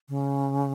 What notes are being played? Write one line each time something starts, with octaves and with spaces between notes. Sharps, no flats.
C#3